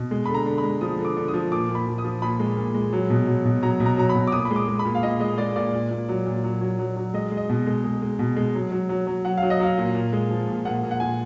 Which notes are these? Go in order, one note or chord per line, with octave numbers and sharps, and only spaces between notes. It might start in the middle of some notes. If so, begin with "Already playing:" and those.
Already playing: B2
G#3
D3 B5
A#5
D3
B5
G#3
F3 D#6
D3
D6
D3
D#6
F3
A#2 D6
A#2
B5
F3
D#6
F3
A#2 B5
G#3
A#2
G#3
F#3
B2
F#3
B2
F#3 A#5
B2
A#5
F#3 A#5
B5
B2
D6
A#2 D#6
B5
G#3
D6
G#3
B5
A#2
F5
A#2 D#5
G#3 D#5
G#3 D5
A#2 D5
A#2
A#2
F#3
A#2
F#3
F#3
F#3
F#3
G#3 D#5
G#3
D#5
B2
G#3
G#3
G#3
B2
G#3
F#3
F#3
F#3
F#3
F#3 F#5
F5
F#3
D#5
F#3 F5
A#2
A#2
G#3
F3
A#2
A#2 F#5
A#2
F#5
A#2 G#5